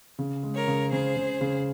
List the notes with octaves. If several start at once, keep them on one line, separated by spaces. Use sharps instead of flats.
C#3
G#3
A#4 C#5
C#3
C#3 G#4 C5
C#3
C#3